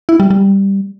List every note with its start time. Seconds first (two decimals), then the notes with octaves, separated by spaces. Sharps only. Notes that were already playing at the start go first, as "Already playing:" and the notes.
0.09 E4
0.20 G3
0.30 G3